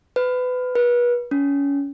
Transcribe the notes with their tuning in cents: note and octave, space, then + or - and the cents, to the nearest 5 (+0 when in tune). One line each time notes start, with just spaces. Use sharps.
B4 +25
B4 -35
C#4 +25